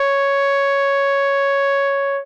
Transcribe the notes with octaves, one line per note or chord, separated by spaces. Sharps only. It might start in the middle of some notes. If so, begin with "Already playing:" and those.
Already playing: C#5